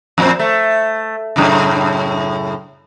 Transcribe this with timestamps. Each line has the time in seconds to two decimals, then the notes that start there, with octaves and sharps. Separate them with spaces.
0.18 F2 A#2 C4
0.39 A3
1.36 F#2 A2 C#3